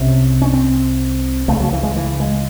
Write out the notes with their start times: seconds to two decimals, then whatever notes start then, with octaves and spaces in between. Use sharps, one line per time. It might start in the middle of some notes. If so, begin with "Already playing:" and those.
Already playing: C2 C3 C#4
0.42 C#4
0.53 C4
1.48 C#2 C#3 A3
1.60 F#3
1.73 E3
1.83 G#3
1.96 E3
2.20 G#3